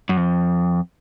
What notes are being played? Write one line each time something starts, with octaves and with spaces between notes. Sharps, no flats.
F#2
F2